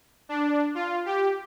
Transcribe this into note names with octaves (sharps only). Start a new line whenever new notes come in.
D4
F4
G4